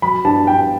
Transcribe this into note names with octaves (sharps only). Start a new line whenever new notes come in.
F#3 B5
G2 A5
G2 G5